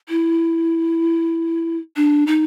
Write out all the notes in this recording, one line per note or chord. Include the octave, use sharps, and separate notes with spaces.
E4
D4
D#4